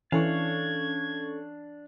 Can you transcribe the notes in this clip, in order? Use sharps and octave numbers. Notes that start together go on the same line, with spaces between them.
E3 C#4 D4 A4 F5 C#6 G#6